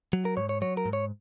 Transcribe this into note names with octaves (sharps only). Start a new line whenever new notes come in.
F#3
A#4
G#2 C#5
C#5
F#3 C#5
A#4
G#2
C#5